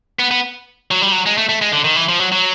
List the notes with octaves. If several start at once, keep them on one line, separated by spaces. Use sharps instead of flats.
B3
B3
F#3
G3
F#3
G#3
A3
A3
G#3
D3
D#3
E3
F3
F#3
F#3